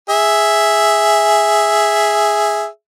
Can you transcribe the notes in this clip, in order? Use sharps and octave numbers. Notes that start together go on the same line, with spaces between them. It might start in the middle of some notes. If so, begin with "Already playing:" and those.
G#4 E5